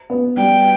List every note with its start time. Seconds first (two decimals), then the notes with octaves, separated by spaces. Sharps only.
0.10 B3
0.37 G3 G5